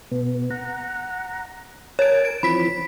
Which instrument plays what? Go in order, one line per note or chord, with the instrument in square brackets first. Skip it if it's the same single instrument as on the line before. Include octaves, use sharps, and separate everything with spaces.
[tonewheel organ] B2 B3
F#5 A#5
[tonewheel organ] A#4 G#5 A5 [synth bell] C#5 D7
[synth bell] D7
[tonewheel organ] E3 F3 C4 [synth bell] B5 B6